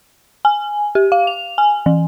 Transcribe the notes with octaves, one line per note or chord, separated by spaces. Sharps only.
G#5
G4
F5
F7
G#5
E3